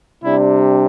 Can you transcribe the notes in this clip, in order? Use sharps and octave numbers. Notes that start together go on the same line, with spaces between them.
C3 G3 D4 E4